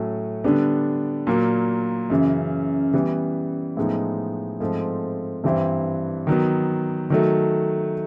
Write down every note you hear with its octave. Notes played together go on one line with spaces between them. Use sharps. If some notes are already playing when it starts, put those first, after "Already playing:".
Already playing: A2 F#3 A3 C#4
D3 G3 B3 D4
A#2 F#3 A#3
F#2 C#3 E3
E3 G3 B3
A2 F3 G#3 B3 D#4
G#2 F3 A3 C4
G2 E3 G3 C4 E4
D#3 F#3 B3
D#3 F#3 A3